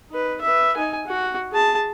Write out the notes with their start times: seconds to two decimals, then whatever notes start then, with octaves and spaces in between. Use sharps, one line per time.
0.10 D#4 B4
0.41 B4 E5
0.77 D#4 G#5
1.07 F#4
1.52 G#4 A5